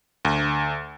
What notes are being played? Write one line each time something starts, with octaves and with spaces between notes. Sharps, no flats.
D2